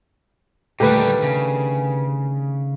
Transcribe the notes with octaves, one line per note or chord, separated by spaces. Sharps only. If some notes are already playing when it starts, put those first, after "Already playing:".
A#2 D3 D#3 G3 A3 G4 B4
C#3